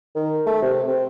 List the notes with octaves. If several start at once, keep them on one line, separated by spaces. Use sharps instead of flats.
D#3
A3
C3
C4